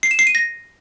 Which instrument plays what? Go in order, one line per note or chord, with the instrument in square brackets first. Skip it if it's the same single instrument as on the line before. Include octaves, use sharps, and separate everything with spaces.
[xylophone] C7
E7
C7
D#7
A#6